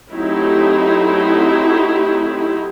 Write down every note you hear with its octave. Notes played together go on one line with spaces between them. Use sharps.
F#3 A3 C4 D#4 E4 G4